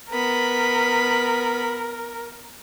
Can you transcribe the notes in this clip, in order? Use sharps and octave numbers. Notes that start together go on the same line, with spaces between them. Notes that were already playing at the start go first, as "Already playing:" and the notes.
B3 A#4 B5